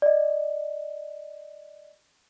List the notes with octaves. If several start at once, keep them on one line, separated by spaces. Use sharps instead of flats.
D5 D#5